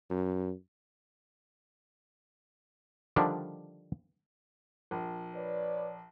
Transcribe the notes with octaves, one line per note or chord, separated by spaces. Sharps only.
F#2
D3 D#3 F3 G3 D4
A#1
B4 C#5 D5